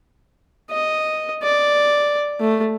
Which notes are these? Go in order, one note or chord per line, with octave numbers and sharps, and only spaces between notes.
D#5
D5
A3